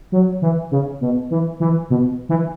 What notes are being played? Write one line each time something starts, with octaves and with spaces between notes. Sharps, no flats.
F#3
E3
C#3
B2
E3
E3
B2
E3